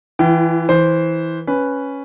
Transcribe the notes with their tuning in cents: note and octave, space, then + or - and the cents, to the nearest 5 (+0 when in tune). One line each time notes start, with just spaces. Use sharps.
E3 +0 E4 +45 G5 -25
E3 -15 C5 +0
C#4 +0 B4 +0